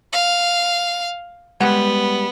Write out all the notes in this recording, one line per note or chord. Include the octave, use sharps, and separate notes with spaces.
F5
G3 G#3 B3 F#5